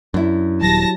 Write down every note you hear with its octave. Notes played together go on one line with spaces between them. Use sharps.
F#2 D4 E4
D#1 F#3 G4 A5 A#6